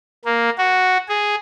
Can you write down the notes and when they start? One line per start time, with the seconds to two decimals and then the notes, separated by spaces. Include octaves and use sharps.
0.25 A#3
0.58 F#4
1.09 G#4